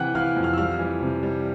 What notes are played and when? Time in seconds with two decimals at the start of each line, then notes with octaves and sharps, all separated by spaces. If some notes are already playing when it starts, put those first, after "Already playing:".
Already playing: C3 E3 F#5 G5 F#6
0.15 E3 F5 F6
0.36 F2
0.43 F5 F6
0.53 E6
0.58 G3 F5 F6
0.79 E3
1.01 C3
1.23 G3